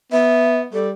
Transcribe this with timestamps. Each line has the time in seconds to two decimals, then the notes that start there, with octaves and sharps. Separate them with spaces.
0.12 B3 E5
0.73 G3 A4